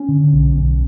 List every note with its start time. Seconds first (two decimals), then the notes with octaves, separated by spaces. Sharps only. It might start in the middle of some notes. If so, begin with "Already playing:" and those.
Already playing: C#4
0.08 D3
0.33 B1
0.56 B1